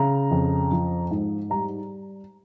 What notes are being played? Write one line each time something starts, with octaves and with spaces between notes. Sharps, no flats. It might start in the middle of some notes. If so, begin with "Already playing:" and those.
Already playing: C#3 A#5
F2
F3
G#2
G3 A#5